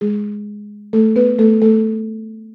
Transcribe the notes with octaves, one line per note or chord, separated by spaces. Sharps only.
G#3 G#4
A3 A4
B3 B4
A3 A4
A3 A4